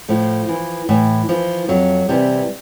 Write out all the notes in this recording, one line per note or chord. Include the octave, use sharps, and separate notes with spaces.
A2 F3
E3
A2 E3
E3 F3
F2 F#3
C3 E3 G3